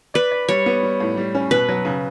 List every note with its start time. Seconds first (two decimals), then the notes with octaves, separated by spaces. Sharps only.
0.14 B4 D5
0.31 D5
0.49 G3 C#5
0.66 B3
0.83 G3
1.00 A2
1.17 G3
1.35 C#4
1.51 B2 B4
1.69 F#3
1.85 C#3